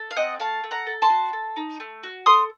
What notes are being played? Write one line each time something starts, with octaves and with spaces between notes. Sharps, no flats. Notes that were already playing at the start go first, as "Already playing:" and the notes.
Already playing: A4
F5
C4 D#5 F#5
A3 F5 A5
A3
F#5 A#5
A4
A5 C6
F#4
A4
D#4
A3
F#4
A4 C6 D#6